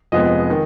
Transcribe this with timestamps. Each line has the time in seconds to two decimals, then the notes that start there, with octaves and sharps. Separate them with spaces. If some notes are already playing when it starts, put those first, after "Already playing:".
0.12 F1 F2 F3 G#3 B3 D#5
0.50 D#3